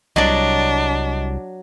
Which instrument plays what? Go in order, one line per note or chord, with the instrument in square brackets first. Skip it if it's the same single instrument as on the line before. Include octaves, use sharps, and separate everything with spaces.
[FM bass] C2 [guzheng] F#3 D5 [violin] D4 [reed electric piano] D#5